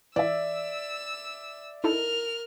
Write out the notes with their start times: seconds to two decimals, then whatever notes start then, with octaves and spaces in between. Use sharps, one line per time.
0.16 E3 D5 E5 E6
1.84 D#4 E4 A4 A#4 F6